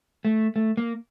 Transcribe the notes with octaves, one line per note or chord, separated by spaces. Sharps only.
A3
A3
A#3